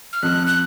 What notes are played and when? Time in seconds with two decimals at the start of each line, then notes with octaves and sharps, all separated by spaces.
0.13 F6
0.23 F2 F#6
0.47 F#6